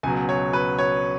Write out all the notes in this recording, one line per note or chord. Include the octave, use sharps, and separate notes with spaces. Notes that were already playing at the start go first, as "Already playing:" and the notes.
C#2 B2 F#3 G#5
C#5
B4
C#5